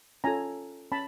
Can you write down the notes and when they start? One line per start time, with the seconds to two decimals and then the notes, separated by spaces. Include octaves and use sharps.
0.24 C#4 F4 A4 G#5 A#5
0.92 C#4 A5 B5